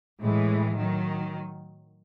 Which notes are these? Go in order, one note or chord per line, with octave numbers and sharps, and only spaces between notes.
A2 E3 G#3
D#3 F#3